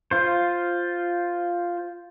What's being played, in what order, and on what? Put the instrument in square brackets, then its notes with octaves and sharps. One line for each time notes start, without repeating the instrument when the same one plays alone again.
[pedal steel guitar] F4 C5